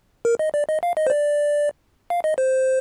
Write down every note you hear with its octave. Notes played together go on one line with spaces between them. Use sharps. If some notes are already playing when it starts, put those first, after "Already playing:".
A#4
D#5
D5
D#5
F5
D#5
C5
D5
F5
D#5
C5